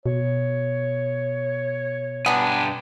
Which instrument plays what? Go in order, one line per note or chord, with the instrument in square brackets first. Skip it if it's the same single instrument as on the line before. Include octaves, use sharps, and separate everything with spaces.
[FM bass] B2 [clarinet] C#5
[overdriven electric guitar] G2 G#5 [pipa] B3 D4